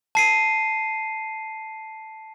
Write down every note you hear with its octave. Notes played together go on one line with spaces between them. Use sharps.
A5 C7 D#7